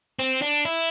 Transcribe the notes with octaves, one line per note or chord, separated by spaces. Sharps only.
C4
D4
E4